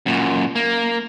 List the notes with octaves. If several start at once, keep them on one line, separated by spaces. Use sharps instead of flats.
F#2 A#2
A#3